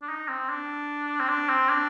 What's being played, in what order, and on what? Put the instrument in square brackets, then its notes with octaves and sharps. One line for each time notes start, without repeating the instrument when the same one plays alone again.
[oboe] D4
D#4
C4
D4
C4
D4
C4
D4